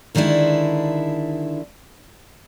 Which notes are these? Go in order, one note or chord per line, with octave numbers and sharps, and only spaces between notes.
D3 D#3 G#3 D4 E4